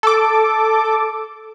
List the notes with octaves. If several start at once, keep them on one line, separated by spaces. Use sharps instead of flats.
A4 D6